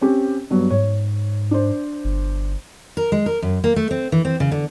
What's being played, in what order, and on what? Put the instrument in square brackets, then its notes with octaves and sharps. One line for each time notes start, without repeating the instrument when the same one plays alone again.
[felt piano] C4 C#4 G4
G2 F#3 B3
[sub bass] G#2 [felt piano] C#5
[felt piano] D4 C5
[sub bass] G1
[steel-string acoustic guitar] A#4
G#3
A#4
F#2
A#3
A3
C4
E3
C4
C#3
D3